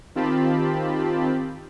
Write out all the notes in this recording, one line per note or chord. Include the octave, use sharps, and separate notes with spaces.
D#3 C4 F4 G4 A5 B5